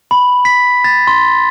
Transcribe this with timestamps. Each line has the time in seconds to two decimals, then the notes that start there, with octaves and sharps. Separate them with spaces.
0.11 B5
0.45 B6
0.84 A6
1.07 C6